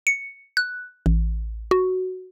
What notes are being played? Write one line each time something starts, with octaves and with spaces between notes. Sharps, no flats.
C#7
F#6
A1
F#4